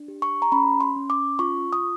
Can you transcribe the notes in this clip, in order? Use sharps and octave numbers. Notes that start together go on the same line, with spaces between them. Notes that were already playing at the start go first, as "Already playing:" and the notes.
Already playing: D4
G4
C#6
A#5
C#4 B5
C6
C#4
D6
F4 C#6
D#6